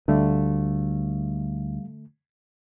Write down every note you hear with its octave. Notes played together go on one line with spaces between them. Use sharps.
D2 D3 G3 A3 F5